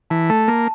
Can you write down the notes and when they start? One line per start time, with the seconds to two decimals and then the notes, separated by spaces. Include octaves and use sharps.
0.10 E3 A5
0.30 A3 A5
0.48 A#3 A5